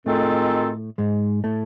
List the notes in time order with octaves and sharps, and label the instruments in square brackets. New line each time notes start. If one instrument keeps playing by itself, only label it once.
[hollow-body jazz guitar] A2 A3 [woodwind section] D#3 G#3 C4 F4 A4
[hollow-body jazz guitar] G#2 G#3
A2 A3